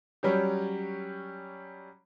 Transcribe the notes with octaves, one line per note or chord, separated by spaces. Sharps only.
F#3 G3 C#4 G4